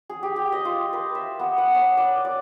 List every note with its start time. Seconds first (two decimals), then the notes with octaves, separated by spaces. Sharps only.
0.09 G#4
0.23 G4
0.36 G4
0.52 D#5
0.65 F4
0.93 B4
1.15 E5
1.39 B3
1.58 F#5
1.75 C#5
1.97 D5
2.25 D5